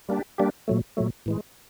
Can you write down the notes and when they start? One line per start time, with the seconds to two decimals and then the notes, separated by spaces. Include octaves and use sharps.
0.09 G3 A#3 D4 G4
0.38 G3 A#3 D4 G4
0.68 A#2 F#3 A3
0.97 A#2 F#3 A3
1.26 A2 E3 G#3